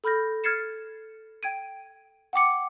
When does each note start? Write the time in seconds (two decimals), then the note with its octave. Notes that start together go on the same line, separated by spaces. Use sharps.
0.04 A4 B5 F6 G6 A#6
0.44 F6 G#6 A6 C7 C#7 E7
1.43 G5 G#6 D7 D#7
2.33 F#5 G5 D6 C#7